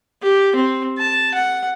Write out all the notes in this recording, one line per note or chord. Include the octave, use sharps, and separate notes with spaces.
G4
C4
A5
F#5